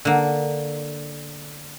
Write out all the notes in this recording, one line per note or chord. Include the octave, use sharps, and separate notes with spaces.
D3 A#3